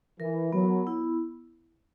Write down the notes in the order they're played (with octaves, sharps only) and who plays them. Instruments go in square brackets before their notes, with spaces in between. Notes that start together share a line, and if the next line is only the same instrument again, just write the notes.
[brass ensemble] E3 [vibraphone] A#4
[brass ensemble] F#3 [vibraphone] B3
[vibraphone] E4